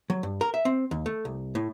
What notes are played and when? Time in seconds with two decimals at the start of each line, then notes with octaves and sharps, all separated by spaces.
0.10 F#3
0.23 G2
0.41 A#4
0.54 E5
0.65 C4
0.91 D#2
1.06 A3
1.25 C2
1.55 A2